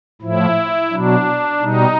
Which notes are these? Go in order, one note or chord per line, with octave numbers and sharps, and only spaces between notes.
A2 F3 E4
B2 F#3 D4
B2 G3 D#4